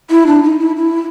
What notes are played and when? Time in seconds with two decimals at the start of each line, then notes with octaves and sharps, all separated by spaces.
0.10 E4
0.27 D4
0.43 D#4
0.59 E4
0.76 E4